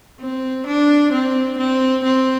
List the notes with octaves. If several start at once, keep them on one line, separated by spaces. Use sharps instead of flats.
C4
D4
C4
C4
C4